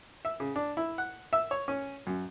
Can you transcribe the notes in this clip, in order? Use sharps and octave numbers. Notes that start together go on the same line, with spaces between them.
E5
C#3
D4
E4
F#5
E5
C#5
C#4
F#2